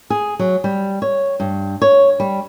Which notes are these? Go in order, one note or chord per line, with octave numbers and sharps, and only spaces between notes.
G#4
F#3
G3
C#5
G2
C#5
G3